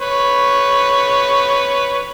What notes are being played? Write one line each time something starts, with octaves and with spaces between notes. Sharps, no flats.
B4 C#5